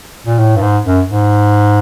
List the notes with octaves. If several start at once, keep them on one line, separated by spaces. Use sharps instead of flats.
A#2
A2
G2
G#2
F#2
G#2